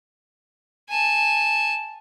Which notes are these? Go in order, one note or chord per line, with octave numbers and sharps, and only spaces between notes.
G#5 A5